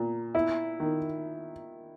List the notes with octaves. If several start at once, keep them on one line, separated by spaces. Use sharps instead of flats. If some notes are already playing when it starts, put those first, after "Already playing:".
Already playing: A#2
E4
D#3